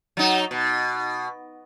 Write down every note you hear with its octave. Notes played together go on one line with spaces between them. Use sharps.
F#3 D#4
B2